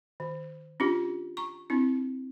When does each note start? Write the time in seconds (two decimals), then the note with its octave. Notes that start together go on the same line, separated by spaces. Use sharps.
0.20 D#3
0.80 C#4 D4 F4 G4
1.37 A#5 C#6
1.70 C4 D4 E4